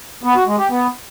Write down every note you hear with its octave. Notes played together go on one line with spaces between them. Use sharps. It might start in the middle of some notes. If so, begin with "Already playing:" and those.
B3
F#4
G#3
G4
B3